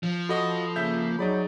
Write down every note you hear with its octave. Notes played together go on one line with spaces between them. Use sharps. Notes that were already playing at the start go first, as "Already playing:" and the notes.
F3
F#4 A4 D#5 B5 D#6
C#3 A#3 E5 G6
F#3 D#4 G#4 D5 B5